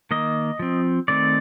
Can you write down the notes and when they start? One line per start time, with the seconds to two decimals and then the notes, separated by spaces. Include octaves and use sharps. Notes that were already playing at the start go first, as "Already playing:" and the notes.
0.11 D#3 A#3 D#5
0.59 F3 C4
1.08 D#3 A3 C4 D5